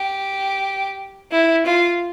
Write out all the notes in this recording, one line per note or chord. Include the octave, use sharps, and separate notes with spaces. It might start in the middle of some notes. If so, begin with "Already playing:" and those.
Already playing: G4
E4
F4